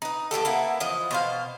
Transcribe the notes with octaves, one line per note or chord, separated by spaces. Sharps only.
D#4 B4
A2 C#3 G4 A4
A#3 B3 E4
E3 F3 D#5
B2 C5 F5